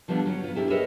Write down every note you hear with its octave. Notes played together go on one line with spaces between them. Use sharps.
D3 F3 G3 B3 C#4 D4
F#3 C#4
B3 F4
D4 E4 G4 A4
G#4 A#4 B4 C#5 D#5 E5